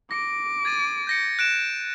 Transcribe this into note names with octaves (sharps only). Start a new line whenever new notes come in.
D6 A#6 D7
G#6 A6 D#7
G6 A#6 C#7
F#6 D7 E7